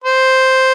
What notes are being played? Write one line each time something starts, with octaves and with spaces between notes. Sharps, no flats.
C5